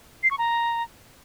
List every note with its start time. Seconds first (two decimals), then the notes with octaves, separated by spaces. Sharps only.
0.23 C7
0.31 C#6
0.38 A#5